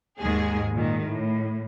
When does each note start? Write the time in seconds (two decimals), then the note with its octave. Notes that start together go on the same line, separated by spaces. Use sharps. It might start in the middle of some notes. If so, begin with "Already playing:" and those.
0.19 D#2 G#2 D#3 G#3 G#4
0.74 A#2 D#3
1.04 A2